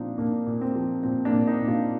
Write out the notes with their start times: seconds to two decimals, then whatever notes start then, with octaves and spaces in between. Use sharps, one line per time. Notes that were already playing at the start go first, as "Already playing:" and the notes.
Already playing: A#2 F3 C4 D4 D#4 F4
0.18 A#2 A#3 D4
0.47 A#2
0.61 C4
0.75 F3
1.03 A#2 C4
1.25 A#3 D4
1.32 A#2
1.47 C4 D#4
1.61 A#2
1.68 D4 F4